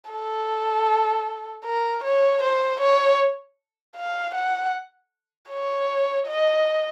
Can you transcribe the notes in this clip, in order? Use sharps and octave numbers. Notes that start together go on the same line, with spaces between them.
A4
A#4
C#5
C5
C#5
F5
F#5
C#5
D#5